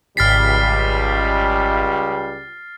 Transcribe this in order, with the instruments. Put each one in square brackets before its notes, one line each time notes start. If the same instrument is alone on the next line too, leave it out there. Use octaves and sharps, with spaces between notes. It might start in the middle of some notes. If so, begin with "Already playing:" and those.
[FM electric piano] G#1 B6 [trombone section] C#2 G3 [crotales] F6 A6 C7